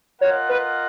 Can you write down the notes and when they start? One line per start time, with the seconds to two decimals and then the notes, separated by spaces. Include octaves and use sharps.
0.21 F4 A#4 C#5 D#5 F#5
0.49 B4